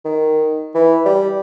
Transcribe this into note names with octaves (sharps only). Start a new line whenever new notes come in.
D#3
E3
G3